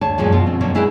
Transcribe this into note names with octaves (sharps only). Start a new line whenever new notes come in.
D2 C#5 A5
F#2 A#2 F3 F#3 G#3
B2 F4
C4
B2 D3 F#3 A#3
G#3 E4 A#4 B4 G5